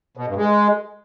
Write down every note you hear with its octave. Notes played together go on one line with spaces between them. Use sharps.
B2
G2
G#3